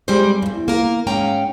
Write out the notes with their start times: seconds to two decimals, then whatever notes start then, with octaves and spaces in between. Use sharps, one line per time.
0.08 G3 G#3 C4 C5 D5
0.42 E2 G2
0.68 A#3 A#4
1.07 G#2 C#4 F5 G5 A#5